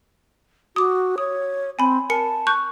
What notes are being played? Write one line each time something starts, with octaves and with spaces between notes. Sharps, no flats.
F#4 D6 D#6
C#5 D#6
C4 G#5 B5
A#4 G#5 A5 C#7
C#6 F#6 G6